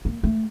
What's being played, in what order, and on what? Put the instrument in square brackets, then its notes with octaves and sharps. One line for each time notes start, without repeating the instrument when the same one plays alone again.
[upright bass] A#3
A3